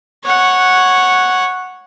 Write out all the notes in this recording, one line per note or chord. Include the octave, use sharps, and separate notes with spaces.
C#5 F#5